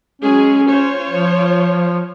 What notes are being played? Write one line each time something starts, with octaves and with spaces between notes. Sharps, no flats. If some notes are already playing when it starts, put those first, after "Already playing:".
F#3 G#3 C#4 G#4
F4 C5 C#5
F3